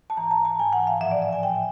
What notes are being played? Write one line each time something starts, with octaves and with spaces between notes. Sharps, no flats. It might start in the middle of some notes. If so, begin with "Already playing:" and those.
A5
G#2 E3 A#5
A#5
A5
G#2 E3 G#5
F#5
F5
A2 F3 E5
D5
E5
G#5
A2 F3 G5